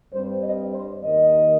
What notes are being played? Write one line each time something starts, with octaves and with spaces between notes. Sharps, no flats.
G2 G3 C4 C5
D#5
C5
D#2 D#3 A#3 D#5